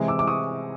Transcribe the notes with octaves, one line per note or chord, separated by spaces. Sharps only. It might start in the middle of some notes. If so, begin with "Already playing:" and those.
Already playing: C3 E3 G#3
D6 E6
D6
C#6 D#6